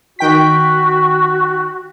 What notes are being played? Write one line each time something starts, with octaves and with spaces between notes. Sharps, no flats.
D#3 F#4 G5 B6